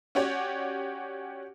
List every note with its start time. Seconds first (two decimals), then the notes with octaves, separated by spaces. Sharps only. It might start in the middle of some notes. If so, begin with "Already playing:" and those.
0.15 C#4 F#4 G4 C#5 D5